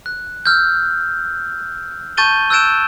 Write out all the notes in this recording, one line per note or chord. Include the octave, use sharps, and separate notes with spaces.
F#6
E6 F6 G6
A5 C#6 G6 A6 D#7 G7
E6 F#6 G6 A6 D7 E7